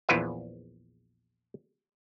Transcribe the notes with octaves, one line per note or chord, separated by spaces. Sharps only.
A#1 E2 E4 F4 B4 E5